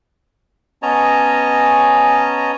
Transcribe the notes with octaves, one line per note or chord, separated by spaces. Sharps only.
B3 C#4 C#5 D#5 A5 A#5